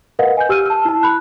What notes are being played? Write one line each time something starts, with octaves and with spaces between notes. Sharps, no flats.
A#4 B4 D#5 F5 F#5
G#5 G6
G4 E6 F6 D#7
A5 E6
E4 A5
B5 F#6